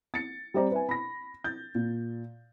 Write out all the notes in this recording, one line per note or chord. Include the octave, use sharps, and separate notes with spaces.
A6 C#7
G3 C4 C5 D5 A#5
B4 E5 G#5
B5 A#6
G6 A6
A#2